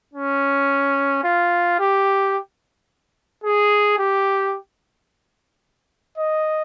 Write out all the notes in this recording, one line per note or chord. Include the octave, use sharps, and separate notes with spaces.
C#4
F4
G4
G#4
G4
D#5